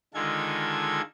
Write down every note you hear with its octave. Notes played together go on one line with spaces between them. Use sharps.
D3 D#3 G#3 F4 A4 G#6